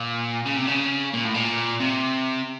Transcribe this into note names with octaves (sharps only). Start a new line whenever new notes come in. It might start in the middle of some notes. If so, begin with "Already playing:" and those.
Already playing: A#2
C#3
C3
C#3
A#2
A2
A#2
C3